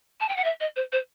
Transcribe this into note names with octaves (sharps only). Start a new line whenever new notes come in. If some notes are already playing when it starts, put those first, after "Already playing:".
A5
G5
F#5
E5
D#5
C5
C5